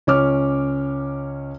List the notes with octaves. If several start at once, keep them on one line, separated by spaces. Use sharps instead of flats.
C#2 C#4 C#5 D6 F6